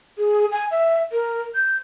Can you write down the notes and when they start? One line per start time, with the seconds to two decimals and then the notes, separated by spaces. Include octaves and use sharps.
0.18 G#4
0.51 G#5
0.71 E5
1.12 A#4
1.55 G6